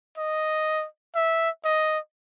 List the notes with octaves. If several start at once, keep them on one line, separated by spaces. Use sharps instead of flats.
D#5
E5
D#5